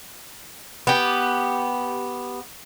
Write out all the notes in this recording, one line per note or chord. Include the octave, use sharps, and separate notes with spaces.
B3 G4